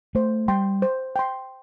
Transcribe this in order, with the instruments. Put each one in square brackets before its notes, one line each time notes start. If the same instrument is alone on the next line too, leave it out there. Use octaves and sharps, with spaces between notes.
[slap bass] A3 [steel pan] C5
[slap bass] G3 [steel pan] G5 C6
[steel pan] C5
G5 C6